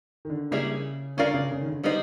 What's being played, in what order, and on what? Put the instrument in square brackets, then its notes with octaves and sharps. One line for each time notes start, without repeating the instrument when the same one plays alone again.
[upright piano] D#3
D3
[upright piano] C#3 [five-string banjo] G3 A#3 C#4 E4 G#4
[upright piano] D3 [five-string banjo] C#4 F4 A#4 D5 F5
[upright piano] C#3
C#3
D#3
D3
[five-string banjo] G3 B3 D#4 G#4 C5